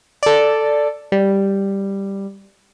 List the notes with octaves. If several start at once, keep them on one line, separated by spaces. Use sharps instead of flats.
A4 D5
G3